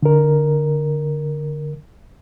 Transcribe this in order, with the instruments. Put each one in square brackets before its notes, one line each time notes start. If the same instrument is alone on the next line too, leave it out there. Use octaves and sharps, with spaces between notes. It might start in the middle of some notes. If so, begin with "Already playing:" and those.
[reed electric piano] D3 A#4